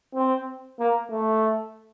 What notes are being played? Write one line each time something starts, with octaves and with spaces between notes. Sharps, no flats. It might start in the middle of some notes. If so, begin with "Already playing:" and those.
C4
A#3
A3